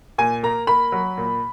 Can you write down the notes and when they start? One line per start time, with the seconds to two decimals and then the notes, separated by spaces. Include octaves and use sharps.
0.18 A#2 G#5
0.43 A#3 A#5
0.67 A#3 B5
0.92 F#3
1.17 A#2